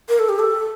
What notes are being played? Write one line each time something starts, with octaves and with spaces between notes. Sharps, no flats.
A#4
A4
G4
A4